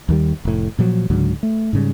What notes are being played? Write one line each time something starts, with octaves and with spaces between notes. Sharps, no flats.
D#2 D#3 G3
F1 A2
A#2 F3 F#3
C#2 G#2 D3 F#3
A3
G#2 C#3 G3